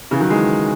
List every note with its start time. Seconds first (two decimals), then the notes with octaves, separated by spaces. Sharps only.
0.11 C#3 E3
0.20 D#3 F#3
0.30 E3 G#3